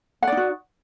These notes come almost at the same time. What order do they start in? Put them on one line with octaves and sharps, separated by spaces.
F#5 D5 D#4 F#4